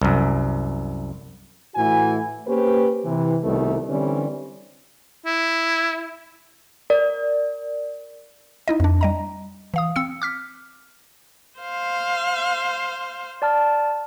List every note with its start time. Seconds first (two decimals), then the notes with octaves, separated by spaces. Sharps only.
0.02 C2 F#2
1.76 A2 E3 E4 F#4 G#5
2.47 A#3 C#4 G4 B4 C5
3.04 C3 E3
3.44 C2 B2 D#3 G3 A3
3.88 D3 E3 G3 C4 C#4
5.26 E4
6.90 A#4 D5
8.68 D#4 E4 D#5
8.80 F2 D4
9.01 G3 D#5 A#5
9.74 E3 F5 D#6
9.96 C4 E6 C#7
10.22 D6 F6 B6
11.60 C5 F5
13.42 D5 A5 F6